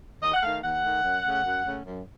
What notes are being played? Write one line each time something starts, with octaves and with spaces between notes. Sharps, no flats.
D#2 D#5
F#5
D#3 A3 F5
D#2 F#5
D#3 A3
F#2
C#3 A3 C#4
F#2
C#3 A3 C#4
F#2